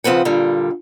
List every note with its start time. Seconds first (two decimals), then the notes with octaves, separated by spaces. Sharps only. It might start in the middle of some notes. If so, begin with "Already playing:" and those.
0.04 C#3 F3 C4 B4 F#5
0.25 G2 A#2 D3 G3